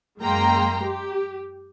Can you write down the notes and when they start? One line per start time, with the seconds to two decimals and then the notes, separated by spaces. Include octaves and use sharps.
0.20 F#2 G#3 A#3 G5 A#5 C6
0.82 G4